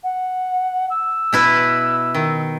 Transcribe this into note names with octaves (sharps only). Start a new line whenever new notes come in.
F#5
E6
B2 E4 B4
D#3